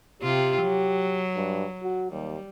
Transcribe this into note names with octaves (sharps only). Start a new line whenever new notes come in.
C3 F4 G4
F#3
G2
F#4
D#2 G3